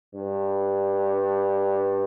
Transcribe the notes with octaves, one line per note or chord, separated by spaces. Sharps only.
G2